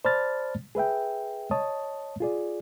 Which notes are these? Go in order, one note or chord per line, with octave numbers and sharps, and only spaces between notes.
C5 D5 A5 B5 F6 A6
G#4 B4 E5 G5
C#5 D#5 A5 D#6
F4 G#4 D5